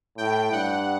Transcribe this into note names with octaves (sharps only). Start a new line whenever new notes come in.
A2 G5
G2 F#5